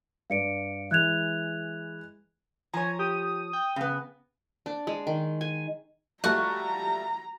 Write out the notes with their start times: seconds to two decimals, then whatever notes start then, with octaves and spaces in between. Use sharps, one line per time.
0.30 G2 D5 F5 C#7 D7
0.91 E3 G#3 F#6 G#6 F7
2.74 F3 C#5 G#5 A#5
2.99 G4 D#6
3.53 G5
3.76 C#3 B3
4.66 D4
4.87 G#3
5.07 D#3
5.41 G#5
6.24 G3 A3 F4 F#4 A#5